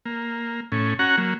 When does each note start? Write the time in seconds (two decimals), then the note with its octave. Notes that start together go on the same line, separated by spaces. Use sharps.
0.06 A#3
0.72 A2 C#4
0.99 C#4 F#4 F#5 A#5
1.17 F#3 A#3